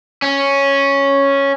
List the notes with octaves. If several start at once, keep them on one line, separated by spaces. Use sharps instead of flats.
C#4